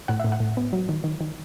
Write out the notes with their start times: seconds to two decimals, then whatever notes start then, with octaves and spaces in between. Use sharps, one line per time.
0.08 A2 F#5
0.20 A2 E5
0.32 F#5
0.40 A2
0.57 B3
0.73 F#3
0.89 D#3
1.04 D#3
1.21 D#3